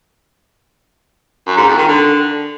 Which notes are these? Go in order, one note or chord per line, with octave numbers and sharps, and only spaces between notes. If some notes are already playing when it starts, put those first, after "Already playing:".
F#2
G#2
F2
D#3
D3